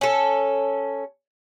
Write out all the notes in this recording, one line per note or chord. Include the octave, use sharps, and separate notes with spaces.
C#4 A4